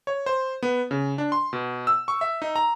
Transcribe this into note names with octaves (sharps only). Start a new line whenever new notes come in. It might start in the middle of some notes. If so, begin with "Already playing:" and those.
C#5
C5
B3
C#3
D4
C6
B2
E6
C#6
E5
D#4
A#5